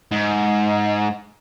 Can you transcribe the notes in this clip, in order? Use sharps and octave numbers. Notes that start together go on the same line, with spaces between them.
G#2